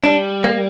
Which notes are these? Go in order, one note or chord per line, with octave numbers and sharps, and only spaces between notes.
G3 D4
A#3